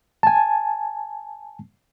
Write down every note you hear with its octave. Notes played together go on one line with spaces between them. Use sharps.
G#5 A5